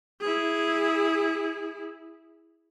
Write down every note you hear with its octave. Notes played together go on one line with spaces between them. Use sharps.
E4 G#4